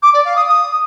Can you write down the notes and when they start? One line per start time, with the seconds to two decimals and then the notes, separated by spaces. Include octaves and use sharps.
0.02 D6
0.13 D5
0.24 F5
0.36 D#6
0.47 D#6